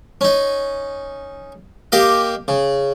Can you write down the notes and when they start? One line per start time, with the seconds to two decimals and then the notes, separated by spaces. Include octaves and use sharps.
0.21 C#4 D#4
1.92 A#3 G4 D#5 F5
2.48 C#3